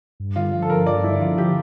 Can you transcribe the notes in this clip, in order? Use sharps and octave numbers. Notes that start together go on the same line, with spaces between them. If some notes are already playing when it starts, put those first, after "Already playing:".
G2
D3 F4
F3
A4
G2 A#4
G2 D5
D3 E4
F3 F4
G4